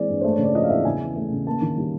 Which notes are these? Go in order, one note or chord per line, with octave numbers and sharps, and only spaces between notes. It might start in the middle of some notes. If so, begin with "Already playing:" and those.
Already playing: E3 G#3 C4 D5
G2
A3 C5
C#5
C#3
D5
F3 D#5
F5
E2 E5
C#3 G#5
E3
A3
C#3
A#3 A5
D#3
G3